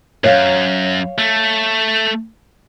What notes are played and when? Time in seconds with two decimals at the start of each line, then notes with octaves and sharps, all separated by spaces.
0.24 F#2 C#5 F5
1.18 A3